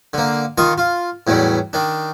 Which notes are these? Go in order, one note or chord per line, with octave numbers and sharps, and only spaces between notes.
D3 A#3
D#3 F4 D#5 C#6
F4
E2 A2 F#3 G3
D#3 D4